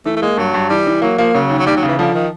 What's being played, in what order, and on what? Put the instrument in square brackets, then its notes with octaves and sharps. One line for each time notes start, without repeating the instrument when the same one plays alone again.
[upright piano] E3 [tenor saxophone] A3
[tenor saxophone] A3
[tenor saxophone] G#3 [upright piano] A#3
[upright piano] G2 [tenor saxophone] F#3
[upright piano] G2
[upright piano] E3 [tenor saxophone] G3
[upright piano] E3
[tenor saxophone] F#3 [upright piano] A#3
[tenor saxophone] F3 [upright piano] A#3
[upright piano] C#3 [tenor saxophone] F#3
[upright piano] D#2
[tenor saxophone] F#3
[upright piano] D#2 [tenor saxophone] G3
[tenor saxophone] F#3
[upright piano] C#3
[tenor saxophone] E3
[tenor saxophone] D3 [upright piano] F3
[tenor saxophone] D#3